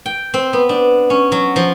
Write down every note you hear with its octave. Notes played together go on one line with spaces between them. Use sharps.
G5
C4
B3
D4
C#4
F#3
F3